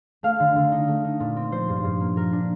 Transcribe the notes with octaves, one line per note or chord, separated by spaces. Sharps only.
A3 F5
D3
D3
D#4
A3
D#4
A#2
C4
F3 C5
G2
G2
A#3
F3 A#4
D4